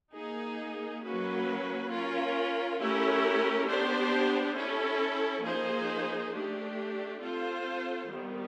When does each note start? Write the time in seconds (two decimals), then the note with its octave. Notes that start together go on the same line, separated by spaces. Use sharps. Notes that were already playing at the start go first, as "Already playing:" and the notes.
0.14 A#3 D#4 G#4
1.03 F#3 A#3 C#4 F#4 B4
1.90 C#4 F4 A#4
2.79 A3 C#4 E4 G4 A#4
3.67 B3 D4 G4 C5
4.56 C#4 E4 A4
5.44 F3 A#3 D#4 G#4 C5
6.32 A3 D4 G4
7.20 C4 F4 A4 C5
8.08 D#3 G3 B3